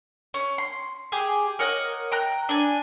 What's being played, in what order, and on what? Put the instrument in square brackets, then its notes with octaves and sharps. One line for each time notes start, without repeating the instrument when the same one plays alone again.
[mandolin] C#4
C6
G4 G#4 G#5
A#4 C#5 D#5 F#5
G5 A#5 F#6
D4 G#5